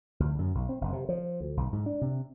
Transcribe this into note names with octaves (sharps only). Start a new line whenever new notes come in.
D2
F#2
B1
C4
F#1
C3
F3
D2
B1
G#2
D4
C3